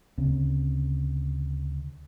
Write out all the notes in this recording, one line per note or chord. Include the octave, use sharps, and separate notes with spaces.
D2 C#3 C4